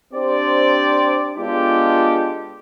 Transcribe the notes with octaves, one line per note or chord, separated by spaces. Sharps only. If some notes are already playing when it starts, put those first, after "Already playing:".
C4 D4 G4 C5 D5
G#3 B3 D4 F4 G4 A4